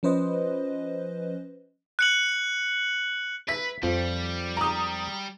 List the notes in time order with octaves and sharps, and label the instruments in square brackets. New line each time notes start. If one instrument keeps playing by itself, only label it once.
[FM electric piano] F3 C#4 B4 C5 D#5
[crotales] F#6 C#7 F#7
[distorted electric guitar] B4 [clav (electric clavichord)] E5 [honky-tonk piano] B6
[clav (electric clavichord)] F2 F3 [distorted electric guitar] G3
[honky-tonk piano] A#5 D#6